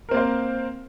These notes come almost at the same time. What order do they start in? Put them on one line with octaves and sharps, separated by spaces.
A#4 C4 A#3 C5